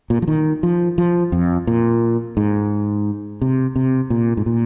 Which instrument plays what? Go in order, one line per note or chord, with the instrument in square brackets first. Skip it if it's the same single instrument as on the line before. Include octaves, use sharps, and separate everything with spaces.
[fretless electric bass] A#2
F3
D#3
F3
F3
F2
A#2
G#2
C3
C3
A#2
G#2
A#2